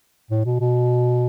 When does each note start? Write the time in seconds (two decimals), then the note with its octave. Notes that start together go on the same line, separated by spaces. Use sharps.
0.31 A2
0.45 B2
0.61 B2